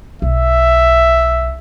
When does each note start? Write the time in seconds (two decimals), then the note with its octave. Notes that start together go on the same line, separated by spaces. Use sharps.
0.22 B1 E5